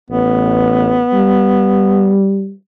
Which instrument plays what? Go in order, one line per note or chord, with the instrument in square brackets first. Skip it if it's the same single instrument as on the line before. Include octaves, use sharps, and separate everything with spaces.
[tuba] A1 [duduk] B3
[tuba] G3